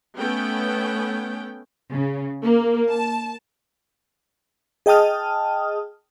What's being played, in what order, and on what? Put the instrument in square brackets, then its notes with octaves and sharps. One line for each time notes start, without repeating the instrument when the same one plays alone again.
[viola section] A3 B3 C#4 G5
[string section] C#3
A#3
A5
[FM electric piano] G#4 D#5 G5 A5 D#6 F6